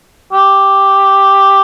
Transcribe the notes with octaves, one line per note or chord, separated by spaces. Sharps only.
G4